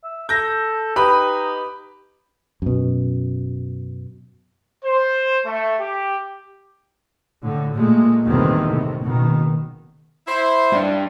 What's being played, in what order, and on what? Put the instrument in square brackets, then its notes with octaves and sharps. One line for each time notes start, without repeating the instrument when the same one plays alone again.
[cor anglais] E5
[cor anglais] A4 [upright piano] G6 A#6
[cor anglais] D#4 [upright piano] G4 B4 B5
[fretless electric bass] F#2 B2
[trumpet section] C5
A3
G4
[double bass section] A2 D3
A#2 G#3 A3
E2 A2 C3 D#3 G3 C4
A2 C3
F#1 B2 D#3
[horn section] E4 C5
[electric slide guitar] G2 D4